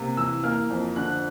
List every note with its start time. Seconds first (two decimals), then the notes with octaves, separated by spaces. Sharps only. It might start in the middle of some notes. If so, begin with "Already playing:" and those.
Already playing: C3 A#3
0.17 E3 E6
0.44 A#3 F6
0.70 F2
0.96 D3 F#6